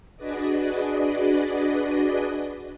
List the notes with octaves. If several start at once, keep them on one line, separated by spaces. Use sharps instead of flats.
D4 F#4 G#4 B4 D5 D#5